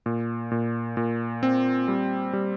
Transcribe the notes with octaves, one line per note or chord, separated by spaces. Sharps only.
A#2
A#2
A#2
C4
G3
G3